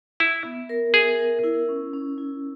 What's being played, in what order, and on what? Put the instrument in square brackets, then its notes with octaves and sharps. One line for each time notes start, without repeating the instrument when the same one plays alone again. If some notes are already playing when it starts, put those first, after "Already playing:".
[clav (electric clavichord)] E4 [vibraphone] E5
[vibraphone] B3
A#4
[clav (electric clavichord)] G#4 [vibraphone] E5
[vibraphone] A#4
E4
C#4
C#4
E4